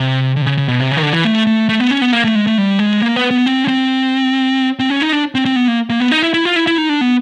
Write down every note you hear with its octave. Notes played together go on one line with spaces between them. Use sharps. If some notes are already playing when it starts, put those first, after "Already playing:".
Already playing: C3
D3
C3
C#3
C#3
B2
C3
C#3
D#3
D3
E3
A3
A3
A3
B3
C#4
B3
A#3
A3
G#3
A3
G3
G#3
A#3
B3
B3
C4
C#4
C4
C4
C#4
D#4
D4
C4
C4
B3
A#3
A#3
B3
D#4
E4
E4
F4
E4
E4
D#4
D4
B3